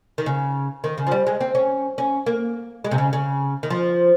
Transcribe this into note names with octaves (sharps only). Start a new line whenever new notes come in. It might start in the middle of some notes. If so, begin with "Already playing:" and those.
D#3
C#3
D#3
C#3
F3
G3
G#3
C4
C#4
C#4
A#3
G#3
C3
C#3
C#3
D#3
F3